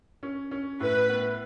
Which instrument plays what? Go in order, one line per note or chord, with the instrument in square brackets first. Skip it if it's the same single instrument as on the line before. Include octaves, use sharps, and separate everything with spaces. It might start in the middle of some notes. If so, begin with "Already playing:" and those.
[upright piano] C#4
C#4
[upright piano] A2 [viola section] B4
[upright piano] B3